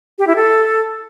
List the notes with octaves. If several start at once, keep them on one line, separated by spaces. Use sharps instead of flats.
G4
E4
A4